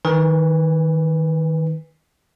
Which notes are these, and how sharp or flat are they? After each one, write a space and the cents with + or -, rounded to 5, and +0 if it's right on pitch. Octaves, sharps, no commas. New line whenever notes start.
D#3 +15 B4 +0 G#5 -25